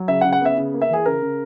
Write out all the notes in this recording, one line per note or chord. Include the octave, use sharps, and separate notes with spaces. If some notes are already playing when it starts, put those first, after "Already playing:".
Already playing: F#3
C#3 E5
F#5
C#3
F#5
B3 E5
C#3
A#3
E5
E3 G#4
C#3 A#4
C#3